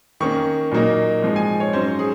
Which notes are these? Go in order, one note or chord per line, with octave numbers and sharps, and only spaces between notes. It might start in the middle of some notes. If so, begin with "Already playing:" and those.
D#3 A#3 C#4 C#6
A#2 F#3 A#3 D#4
G#2 F3 G#3 D#4
G#5
C#5
G#2 F#3 C#4 C5
G#4